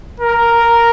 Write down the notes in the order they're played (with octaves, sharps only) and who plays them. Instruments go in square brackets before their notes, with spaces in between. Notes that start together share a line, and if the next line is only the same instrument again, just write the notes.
[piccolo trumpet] A#4